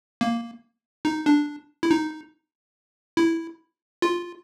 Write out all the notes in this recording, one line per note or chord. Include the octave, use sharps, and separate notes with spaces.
A#3
D#4
D4
E4
D#4
E4
F4